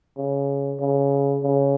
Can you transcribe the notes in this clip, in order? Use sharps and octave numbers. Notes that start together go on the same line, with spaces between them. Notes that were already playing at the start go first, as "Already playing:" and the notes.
C#3
C#3
C#3